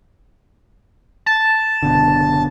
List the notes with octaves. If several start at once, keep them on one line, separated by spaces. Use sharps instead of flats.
A5
F#1 B2 D3